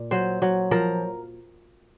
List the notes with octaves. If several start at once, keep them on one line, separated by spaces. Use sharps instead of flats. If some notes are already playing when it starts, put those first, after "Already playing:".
Already playing: A#2
F#3 C5
F#3
F3 A#4